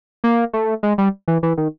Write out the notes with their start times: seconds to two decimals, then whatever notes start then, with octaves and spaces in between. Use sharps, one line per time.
0.24 A#3
0.53 A3
0.83 G#3
0.98 G3
1.28 E3
1.43 E3
1.58 D#3